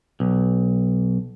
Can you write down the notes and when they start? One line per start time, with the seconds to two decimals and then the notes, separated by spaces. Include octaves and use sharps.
0.20 B1